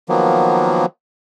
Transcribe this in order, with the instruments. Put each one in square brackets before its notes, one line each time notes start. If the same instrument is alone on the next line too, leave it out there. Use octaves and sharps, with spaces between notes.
[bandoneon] D#3 F3 F#3 A#3 B3